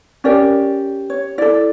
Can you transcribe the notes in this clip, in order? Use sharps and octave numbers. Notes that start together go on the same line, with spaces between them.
C#4 G4 A#4 D5
C#5
E4 A4 D5